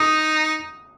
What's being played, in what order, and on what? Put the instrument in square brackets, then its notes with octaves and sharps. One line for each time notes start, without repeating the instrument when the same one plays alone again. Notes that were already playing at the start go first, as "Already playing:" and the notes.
Already playing: [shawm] D#4 [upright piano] D#6